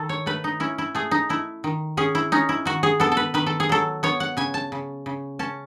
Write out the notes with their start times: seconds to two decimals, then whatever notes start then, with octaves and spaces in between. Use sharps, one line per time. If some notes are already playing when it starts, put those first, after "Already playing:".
Already playing: D#3 A4
0.09 C#5
0.26 A3 B4
0.44 D#4
0.60 C#4 E4
0.78 E4
0.95 A3 G#4
1.11 D#4
1.29 A3 E4
1.64 D#3
1.97 C#4 G#4
2.15 E4
2.32 C#4 D#4
2.49 E4
2.65 D#3 F#4
2.83 G#4
3.00 B3 A4
3.12 A4
3.17 B4
3.34 D#3 B4
3.46 A4
3.60 G#4
3.69 F#3 A4
4.03 B3 C#5
4.20 F#5
4.37 C#3 G#5
4.54 A5
4.72 C#3
5.06 C#3
5.39 C#4 A5